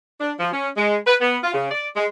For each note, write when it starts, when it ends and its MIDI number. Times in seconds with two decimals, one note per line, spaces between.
0.20 0.32 62
0.40 0.51 53
0.53 0.67 61
0.77 0.96 56
1.06 1.15 71
1.21 1.37 59
1.43 1.51 65
1.54 1.71 49
1.71 1.87 74
1.96 2.05 56